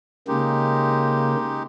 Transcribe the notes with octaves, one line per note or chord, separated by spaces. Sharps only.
C#3 G#3 A#3 D#4 G4